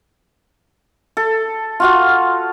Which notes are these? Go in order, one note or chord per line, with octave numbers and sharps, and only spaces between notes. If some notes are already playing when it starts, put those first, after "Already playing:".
A4
F4 F#4 F5